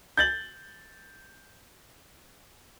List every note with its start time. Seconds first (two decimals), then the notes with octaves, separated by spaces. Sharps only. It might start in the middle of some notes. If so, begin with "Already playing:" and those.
0.17 G6 A6 F#7